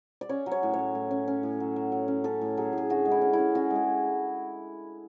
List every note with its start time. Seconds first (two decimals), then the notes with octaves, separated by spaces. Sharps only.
0.21 D5
0.29 C#4 C#5
0.46 F#3
0.52 C#5
0.63 A2
0.73 C#5
0.79 A2
0.95 A2
1.11 C#4
1.28 C#4
1.43 A2
1.60 F#3
1.76 F#3
1.92 F#3
2.08 C#4
2.24 C#4 A4
2.41 A2
2.57 F#3 G#4
2.73 A2 G#4
2.90 D3 F#4
3.05 G#3
3.11 E4
3.21 C#4
3.33 C#4 E4
3.55 C#4 F#4
3.70 G#3
3.76 G#4